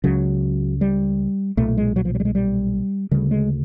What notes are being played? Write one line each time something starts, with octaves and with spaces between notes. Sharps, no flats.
C#2 C#3 F#3
G3
B1 A#2 A3
G#3
F#3
F3
F#3
G3
G#3
G3
D2 C#3 G3
G#3